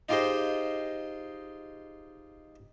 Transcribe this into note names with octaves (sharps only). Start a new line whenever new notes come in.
D#4 F4 G4 G#4 C5 D#5